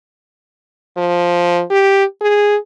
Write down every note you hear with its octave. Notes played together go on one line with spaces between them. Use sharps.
F3
G4
G#4